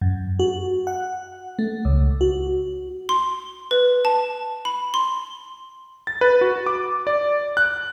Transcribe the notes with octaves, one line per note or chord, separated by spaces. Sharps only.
F#2
F#4
F#5
A3
C#2
F#4
C6
B4
A5
B5
C6
A6
B4
F#4
D6
D5
F#6